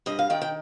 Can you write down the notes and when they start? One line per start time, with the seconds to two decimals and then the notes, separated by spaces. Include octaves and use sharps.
0.06 G2 D#5
0.19 F5
0.30 D#3 G5
0.42 G5